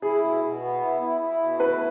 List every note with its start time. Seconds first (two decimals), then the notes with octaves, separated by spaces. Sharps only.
0.02 E4 G#4
0.22 B2
0.42 B2
0.61 B3
0.81 E4
1.01 E4
1.21 E4
1.40 B2
1.60 E4 B4